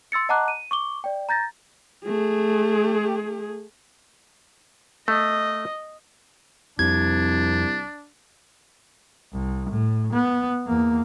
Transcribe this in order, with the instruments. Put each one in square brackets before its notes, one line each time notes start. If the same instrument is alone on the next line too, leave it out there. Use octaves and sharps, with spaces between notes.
[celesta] C6 E6 A6 C#7
D#5 F#5 A5 A#5 D6 F#6
D#7
C#6 D6 G7
D5 G5
A#5 G6 A6 A#6
[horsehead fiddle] A3 G#4
[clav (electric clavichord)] A3 [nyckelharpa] D#5
[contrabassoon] C2 [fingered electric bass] F2 [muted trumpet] D4 [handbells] G#6
[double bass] C2
A2
B3
E2 A#3